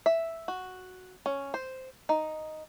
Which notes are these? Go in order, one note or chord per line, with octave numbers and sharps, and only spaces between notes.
E5
F#4
C#4
C5
D#4